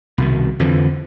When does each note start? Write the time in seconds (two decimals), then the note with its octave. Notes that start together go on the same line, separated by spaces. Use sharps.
0.18 C2 B2 D#3
0.59 F2 D3 E3 F3